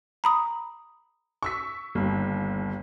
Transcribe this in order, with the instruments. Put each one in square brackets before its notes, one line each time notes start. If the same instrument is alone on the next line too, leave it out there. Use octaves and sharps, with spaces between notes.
[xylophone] A#5 B5 D#6
[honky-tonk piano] C#6 E6 B6
G1 D#2